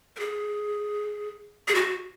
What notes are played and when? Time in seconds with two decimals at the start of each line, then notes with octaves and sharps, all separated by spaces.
0.16 A#4
0.19 G#4
1.68 G#4
1.75 F#4